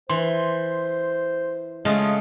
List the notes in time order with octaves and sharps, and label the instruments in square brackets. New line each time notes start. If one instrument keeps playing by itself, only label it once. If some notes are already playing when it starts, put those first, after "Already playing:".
[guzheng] E3 [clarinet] C5 [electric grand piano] C6
[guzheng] C#3 A3 F4 [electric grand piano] G#3 [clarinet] D#5